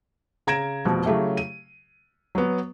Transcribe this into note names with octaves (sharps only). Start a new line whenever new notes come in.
C#3 A#5 G#6 A#6 D7 E7
F1 B2 F3
C#3 F#3 A3 E4 G4
D#7
F#3 B3